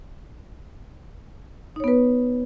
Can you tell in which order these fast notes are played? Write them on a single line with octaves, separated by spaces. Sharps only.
D#4 C#5 B3 B4